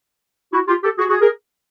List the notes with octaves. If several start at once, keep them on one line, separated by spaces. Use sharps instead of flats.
E4 F#4
F4 G4
G4 A4
F#4 G#4
F#4 G#4
G#4 A#4